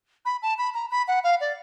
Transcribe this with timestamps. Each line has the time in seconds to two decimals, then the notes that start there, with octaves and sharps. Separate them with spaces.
0.25 B5
0.42 A5
0.58 B5
0.74 A#5
0.91 B5
1.08 F#5
1.24 F5
1.41 D5